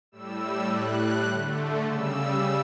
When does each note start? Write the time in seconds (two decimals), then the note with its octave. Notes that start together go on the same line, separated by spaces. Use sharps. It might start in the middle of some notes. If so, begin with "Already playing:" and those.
0.12 A2 G3 E6
0.68 A2 G3 F#6
1.25 D3 A3
1.81 C#3 G3 E6